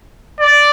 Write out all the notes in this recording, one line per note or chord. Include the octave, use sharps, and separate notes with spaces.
D5